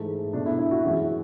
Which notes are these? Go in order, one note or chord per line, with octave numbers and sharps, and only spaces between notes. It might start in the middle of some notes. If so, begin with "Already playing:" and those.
Already playing: G#2 E3 A3
B2 A3 D4
E4
E4
F#4
F#2 E3 G#3 F#4